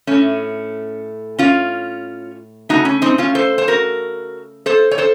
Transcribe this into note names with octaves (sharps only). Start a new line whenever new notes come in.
A2 A3 C#4
C#4 F4
C#3 A3 D#4 F#4
C#4
C4 D#4
C#4 F4
A4 C5
C5
F#4 A#4
A4 C5
C#5
A4 C5